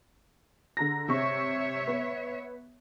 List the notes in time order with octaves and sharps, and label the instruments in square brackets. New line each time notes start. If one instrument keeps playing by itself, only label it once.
[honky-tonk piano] D3 A#5 A#6
[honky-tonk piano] C3 C#6 [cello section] C#5 E5
[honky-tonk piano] B3